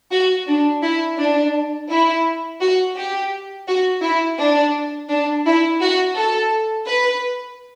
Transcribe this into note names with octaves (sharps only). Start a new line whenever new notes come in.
F#4
D4
E4
D4
E4
F#4
G4
F#4
E4
D4
D4
E4
F#4
A4
B4